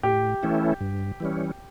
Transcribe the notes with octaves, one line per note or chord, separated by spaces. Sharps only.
A2 G4
E3 A3 C#4 E4
G2
E3 G3 C#4